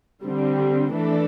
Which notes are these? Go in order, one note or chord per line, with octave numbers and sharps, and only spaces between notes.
D3 G3 C4
E3 A3 D4 A4